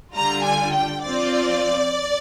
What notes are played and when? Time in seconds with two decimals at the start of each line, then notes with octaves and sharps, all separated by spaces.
0.14 D3 G3 D4 F4 A#5
0.43 G#5
0.73 G5
1.03 F3 C4 F4 D5